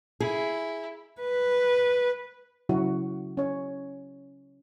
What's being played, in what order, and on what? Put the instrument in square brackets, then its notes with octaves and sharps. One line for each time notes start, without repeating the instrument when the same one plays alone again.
[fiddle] E4 [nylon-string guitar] G#4
[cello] B4
[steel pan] C#3 F#3 E4 F#4
C#4 C#5